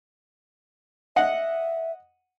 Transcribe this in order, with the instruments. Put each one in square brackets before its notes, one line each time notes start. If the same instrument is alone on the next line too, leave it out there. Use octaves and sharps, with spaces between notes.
[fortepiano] D#5 F#5 [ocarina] E5